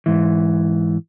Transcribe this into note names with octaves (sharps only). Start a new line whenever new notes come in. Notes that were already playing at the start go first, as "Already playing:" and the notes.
G#2 E3